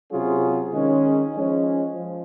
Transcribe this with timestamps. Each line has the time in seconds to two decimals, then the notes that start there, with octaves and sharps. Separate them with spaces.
0.11 C3 F#3 C#4 F4 G#4
0.72 D#3 G#3 C#4
1.34 F3 G#3 C#4
1.94 F3